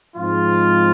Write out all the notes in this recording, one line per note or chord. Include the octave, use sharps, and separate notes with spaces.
G#2 F3 G#3 C4 F4